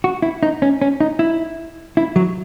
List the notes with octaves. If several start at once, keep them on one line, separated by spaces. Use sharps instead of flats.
F#4
E4
D#4
C#4
C#4
D#4
E4
E4
F#3